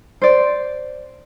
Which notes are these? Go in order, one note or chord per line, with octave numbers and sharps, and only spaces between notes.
C5 D5